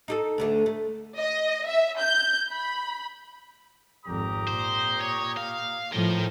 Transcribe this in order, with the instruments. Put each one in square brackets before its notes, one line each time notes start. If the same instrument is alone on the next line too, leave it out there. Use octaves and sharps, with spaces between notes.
[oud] D#4 G4 A4
D2 D3 A3
A3
[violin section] D#5
E5
G6
B5
[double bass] G#1 F2 [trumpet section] G4 A#5 D#6
[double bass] A#2 [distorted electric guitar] C5
[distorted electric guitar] C#5
F5
[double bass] A2 F3 [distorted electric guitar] A#4 G5